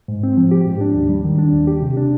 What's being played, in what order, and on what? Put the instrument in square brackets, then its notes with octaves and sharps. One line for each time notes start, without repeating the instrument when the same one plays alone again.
[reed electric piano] G#2
C4
F3
G4
G#2
D4
D#2
G3
D#3
D4
D#2
G4
C3
D4